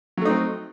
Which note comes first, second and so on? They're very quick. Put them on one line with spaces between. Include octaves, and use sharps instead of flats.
F#3 A3 D#4 C4